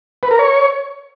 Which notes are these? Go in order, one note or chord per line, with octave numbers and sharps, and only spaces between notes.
B4
A#4
C#5